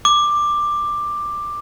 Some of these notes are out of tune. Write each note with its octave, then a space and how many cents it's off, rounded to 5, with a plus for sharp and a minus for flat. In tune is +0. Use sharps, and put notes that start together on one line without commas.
D6 +10